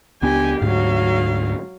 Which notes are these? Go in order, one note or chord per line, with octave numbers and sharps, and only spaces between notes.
C#2 B3 D4 G4 G#5
D2 G#2 F#3 F5